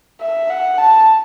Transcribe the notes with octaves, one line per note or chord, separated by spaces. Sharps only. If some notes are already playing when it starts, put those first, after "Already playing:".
E5
F#5
A5